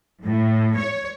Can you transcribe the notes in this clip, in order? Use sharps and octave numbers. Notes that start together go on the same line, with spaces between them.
A2
C#5